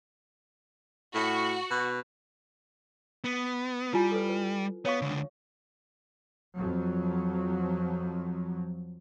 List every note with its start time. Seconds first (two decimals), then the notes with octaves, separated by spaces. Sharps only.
1.15 A2 F#4
1.71 B2
3.24 B3
3.93 G3 E4 F4 G#5
4.12 A4 B4
4.29 B4
4.85 B3 C#5 F5 C#6
5.01 C#2 D3
6.57 F2 F3 F#3